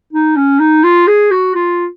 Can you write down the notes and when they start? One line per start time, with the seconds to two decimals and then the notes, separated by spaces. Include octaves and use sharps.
0.13 D#4
0.36 C#4
0.59 D#4
0.83 F4
1.07 G#4
1.31 F#4
1.55 F4